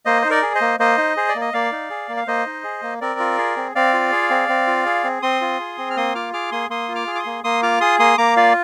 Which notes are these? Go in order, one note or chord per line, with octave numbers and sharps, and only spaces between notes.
A#3 C5 D#5
D#4 C5
A#4 D5
G#4
C5 D#5
A#3
A#3 C5 D#5
D#4
G#4 C5
D5
A#3
D#5
A#3 D5 F5
D#4
G#4
A#3
F5
A#3 C5 D#5
D#4
G#4
A#3
C4 A#4 D5
F4
G#4
C4
C4 D5 F5
F4
G#4
C4
C4
F4
G#4
C4
C4 C6 D#6
F4
G#4
C4
F6
A#3 C6 D#6
F4 D6 F6
G#4 D6 F6
A#3 C6 D#6
A#3 C6 D#6
F4
D6 F6
G#4
D6
C6 D#6
A#3
A#3 C6 D#6
F4 D6 F6
G#4 C6 D#6
A#3 C6 D#6
A#3 A#5 D6
F4 D5 F5